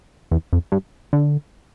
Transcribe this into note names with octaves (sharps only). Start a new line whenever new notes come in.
E2
F2
G2
D3